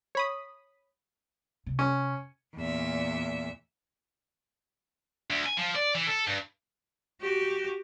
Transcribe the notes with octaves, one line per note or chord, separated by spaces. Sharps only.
C#5 B5 D#6
C3
C#4
E2 A#2 E5
D2
G#5
F3
D5
E3
A4
G2
F#4 G4